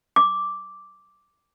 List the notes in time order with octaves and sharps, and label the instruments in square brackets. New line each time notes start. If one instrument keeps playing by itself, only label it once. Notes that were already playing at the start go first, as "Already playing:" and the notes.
[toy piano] D6